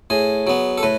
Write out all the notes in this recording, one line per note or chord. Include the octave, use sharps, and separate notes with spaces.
A2 G#4
F#3 B3
A4
A2 B4